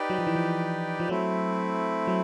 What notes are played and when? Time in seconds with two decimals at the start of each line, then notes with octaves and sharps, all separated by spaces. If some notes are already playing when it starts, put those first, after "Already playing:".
Already playing: D#4 G4 B4 D5 G5
0.10 F#3
0.19 F3
0.27 E3
0.36 F3
1.00 F3
1.09 F#3 A3 C4 E4
2.07 F#3